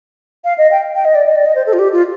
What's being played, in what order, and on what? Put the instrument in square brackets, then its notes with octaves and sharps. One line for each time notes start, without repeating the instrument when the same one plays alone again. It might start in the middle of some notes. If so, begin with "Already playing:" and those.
[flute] F5
D#5
G5
G5
D#5
D5
D#5
D5
D#5
C5
A4
F4
G4
F4